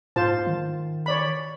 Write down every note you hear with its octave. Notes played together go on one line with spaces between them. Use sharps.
G#2 F4 C5 A5
D#3
C#5 D5 B5